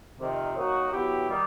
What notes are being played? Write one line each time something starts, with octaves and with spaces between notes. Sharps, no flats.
F2 C3 D#3
D#3 F#3 A#3 D#4 F#4
F#3 B3 E4 G4
D#3 G3